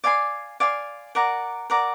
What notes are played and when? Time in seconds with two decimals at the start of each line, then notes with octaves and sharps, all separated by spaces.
0.04 D5 F5 G#5 C6
0.60 D5 F5 G#5 C6
1.15 A#4 D5 F#5 A#5
1.70 A#4 D5 F#5 A#5